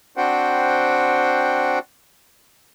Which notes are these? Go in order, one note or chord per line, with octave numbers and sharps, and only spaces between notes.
C4 D4 F#4 C5 F#5 G5